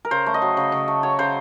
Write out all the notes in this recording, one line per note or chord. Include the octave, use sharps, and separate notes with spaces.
A#4
C#3 C5
A3
D#5
F#3
C#3
C#3
A3
F#3 C#5
C#3 C5